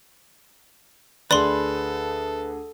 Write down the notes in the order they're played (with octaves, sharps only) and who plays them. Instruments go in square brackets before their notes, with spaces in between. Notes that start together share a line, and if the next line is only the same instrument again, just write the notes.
[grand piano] D2 G#4 [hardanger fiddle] A4 [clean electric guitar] B4 [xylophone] D5 B5 C6